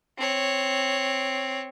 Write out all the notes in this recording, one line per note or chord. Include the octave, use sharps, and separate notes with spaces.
C4 C#5